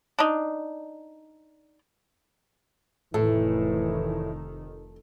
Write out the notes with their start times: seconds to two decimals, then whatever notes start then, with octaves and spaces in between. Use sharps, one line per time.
0.19 D4 D#4
3.14 F1 A2 D#3 E3 A4